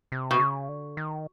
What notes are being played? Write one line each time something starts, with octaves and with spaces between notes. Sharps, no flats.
C3
B2
C#3
D3
D#3